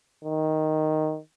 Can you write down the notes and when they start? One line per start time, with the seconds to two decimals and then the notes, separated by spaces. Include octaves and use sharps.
0.24 D#3